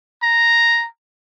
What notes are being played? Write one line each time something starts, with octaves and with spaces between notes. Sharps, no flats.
A#5